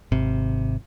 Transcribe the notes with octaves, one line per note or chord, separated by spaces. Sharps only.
G#1 C3